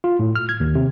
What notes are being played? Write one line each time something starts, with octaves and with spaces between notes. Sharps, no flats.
F4
A2
F6
G#6
D#2
C3